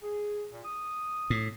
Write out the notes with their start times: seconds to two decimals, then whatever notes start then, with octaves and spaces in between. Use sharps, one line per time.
0.02 G#4
0.52 A#2
0.65 D#6
1.30 A2